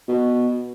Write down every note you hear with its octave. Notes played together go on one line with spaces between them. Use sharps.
B2